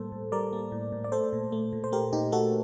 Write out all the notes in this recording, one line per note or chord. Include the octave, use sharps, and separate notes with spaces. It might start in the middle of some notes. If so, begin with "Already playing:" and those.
Already playing: A2 G3 A#3 A4 C5
A2
G3 A#4 D5
A#3
A2
A2
D5
A3 A4 C5
A#2
A3
A#2
C5
A3 G4 A#4
A#2 D#4 G4
A3 F#4 A4